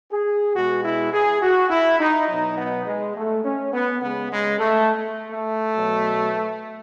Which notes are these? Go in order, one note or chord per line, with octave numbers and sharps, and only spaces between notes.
G#4
B2 G#3 F#4
E4
G#4
F#4
E4
D#4
B2 F#3 D#4
B3
G#3
A3
C#4
B3
C#3 G#3 B3
G#3
A3
A3
B2 F#3